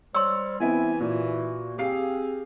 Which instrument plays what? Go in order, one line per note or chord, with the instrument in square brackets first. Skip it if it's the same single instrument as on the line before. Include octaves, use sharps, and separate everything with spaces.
[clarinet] G3 [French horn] C5 [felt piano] C#5 [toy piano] C6 E6
[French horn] E3 [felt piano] B3 C4 E4 [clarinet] G#5
[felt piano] A#2 [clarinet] F#4
[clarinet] C4 [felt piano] G4 F5 C7 [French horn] G#4